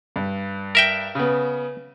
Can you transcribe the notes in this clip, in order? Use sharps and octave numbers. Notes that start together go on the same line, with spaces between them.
G2
A#4 E5 G5
C#3 B3